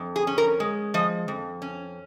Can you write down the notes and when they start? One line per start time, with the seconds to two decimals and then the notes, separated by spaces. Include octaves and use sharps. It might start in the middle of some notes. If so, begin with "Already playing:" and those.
Already playing: F2
0.16 G#4
0.27 C#4
0.38 A#4
0.60 G#3
0.94 F3 D#5
1.28 F2
1.62 C#4